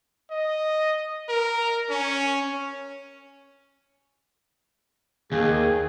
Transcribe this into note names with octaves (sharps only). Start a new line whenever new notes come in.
D#5
A#4
C#4
D#2 G#4